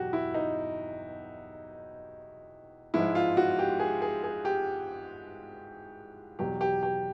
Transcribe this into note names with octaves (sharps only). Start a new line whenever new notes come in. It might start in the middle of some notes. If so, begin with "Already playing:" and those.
Already playing: E2 B2 F#3 F#4 G4
E4
D#4
G#2 F3 G#3 E4
F4
F#4
G4
G#4
G#4
G#4
G4
E2 B2 F#3 G4
G4
G4